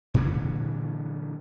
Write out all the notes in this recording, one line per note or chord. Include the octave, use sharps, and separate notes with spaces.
A#2 D3 E3 F#3